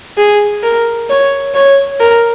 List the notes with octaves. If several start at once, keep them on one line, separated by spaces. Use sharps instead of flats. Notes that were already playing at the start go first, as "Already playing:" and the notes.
G#4
A#4
C#5
C#5
A#4